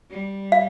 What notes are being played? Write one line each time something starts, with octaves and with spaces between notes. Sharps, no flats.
G3
F5